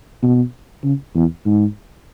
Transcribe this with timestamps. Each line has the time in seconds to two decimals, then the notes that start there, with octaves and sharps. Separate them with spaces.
0.23 B2
0.84 C#3
1.15 E2
1.46 G#2